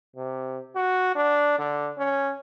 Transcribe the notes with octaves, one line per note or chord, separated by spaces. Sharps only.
C3
F#4
D4
D3
C#4